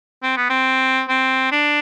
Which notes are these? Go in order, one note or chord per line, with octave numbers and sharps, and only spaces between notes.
C4
B3
C4
C4
D4